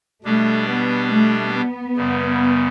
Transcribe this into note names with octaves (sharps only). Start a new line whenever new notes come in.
B2 G3 A3 D4 G4
B3
A3
B3
F#2 C#3 G3